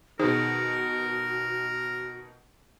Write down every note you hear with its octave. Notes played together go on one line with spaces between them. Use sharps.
B2 D#3 D#4 F#4 G#4 A#4 C5